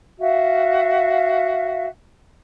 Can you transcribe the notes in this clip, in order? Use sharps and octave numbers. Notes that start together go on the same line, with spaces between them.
F#4 E5 F5